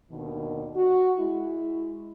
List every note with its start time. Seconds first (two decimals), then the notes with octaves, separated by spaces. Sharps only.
0.12 D#2 B2 D3 D#3
0.76 F#4
1.19 G#3 E4